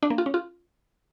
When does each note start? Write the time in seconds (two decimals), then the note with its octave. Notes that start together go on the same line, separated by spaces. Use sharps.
0.03 D4
0.10 A#3
0.18 F4
0.26 C#4
0.34 F4